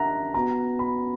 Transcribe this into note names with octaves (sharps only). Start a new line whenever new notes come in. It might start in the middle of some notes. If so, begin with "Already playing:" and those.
Already playing: D4 G4 A#4 E5 F#5 A#5
B3 F#4 B4 F#5 A#5
B5